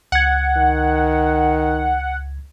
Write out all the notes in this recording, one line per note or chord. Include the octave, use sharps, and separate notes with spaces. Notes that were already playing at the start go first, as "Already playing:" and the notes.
C#2 F#5 G#6
D#3